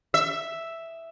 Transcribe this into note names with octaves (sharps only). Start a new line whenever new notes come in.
E5